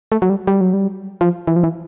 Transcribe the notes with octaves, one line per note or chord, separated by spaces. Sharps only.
A3
F#3
G3
G3
F#3
G3
F3
E3
F3
E3